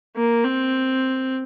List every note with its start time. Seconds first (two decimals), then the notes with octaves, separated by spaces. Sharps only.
0.16 A#3
0.44 C4